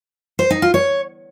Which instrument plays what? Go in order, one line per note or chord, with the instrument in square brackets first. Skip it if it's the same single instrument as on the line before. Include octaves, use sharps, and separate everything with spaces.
[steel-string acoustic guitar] C5
D#4
F4
C#5